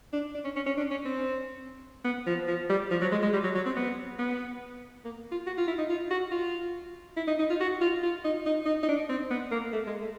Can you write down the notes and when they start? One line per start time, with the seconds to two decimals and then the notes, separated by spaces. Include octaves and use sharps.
0.13 D4
0.34 D4
0.44 C#4
0.56 C#4
0.66 C#4
0.77 D4
0.91 C#4
1.05 C4
2.05 B3
2.27 F3
2.48 F3
2.70 G3
2.91 F3
3.02 F#3
3.12 G#3
3.22 G#3
3.33 G3
3.43 F#3
3.55 F#3
3.66 C4
3.76 B3
4.19 B3
5.04 A#3
5.32 F4
5.47 F#4
5.58 F4
5.68 E4
5.78 D#4
5.90 F4
6.11 F#4
6.32 F4
7.17 E4
7.27 D#4
7.39 D#4
7.50 F4
7.60 F#4
7.81 F4
8.03 F4
8.24 D#4
8.46 D#4
8.66 D#4
8.83 D#4
8.89 D4
9.09 C4
9.31 B3
9.52 A#3
9.73 A3
9.87 G#3
10.01 A3